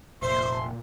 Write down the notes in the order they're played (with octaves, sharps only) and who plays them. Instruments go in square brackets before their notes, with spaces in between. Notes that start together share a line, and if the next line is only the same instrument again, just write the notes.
[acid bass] F1 [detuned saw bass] A#2 [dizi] C5 [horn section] E5 C6